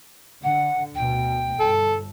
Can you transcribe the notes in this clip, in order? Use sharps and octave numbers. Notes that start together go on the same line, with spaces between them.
D3 F#5
D2 B2 G5
G1 A4